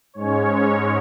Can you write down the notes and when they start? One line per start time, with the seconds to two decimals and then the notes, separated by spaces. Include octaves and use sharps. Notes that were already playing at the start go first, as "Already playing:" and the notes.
0.14 G#2 G#3 C#4 C#5